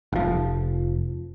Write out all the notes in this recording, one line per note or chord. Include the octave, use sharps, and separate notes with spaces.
F1 F3